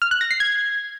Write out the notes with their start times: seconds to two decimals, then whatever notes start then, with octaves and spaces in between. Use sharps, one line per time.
0.02 F6
0.11 F#6
0.21 A#6
0.31 C7
0.40 G#6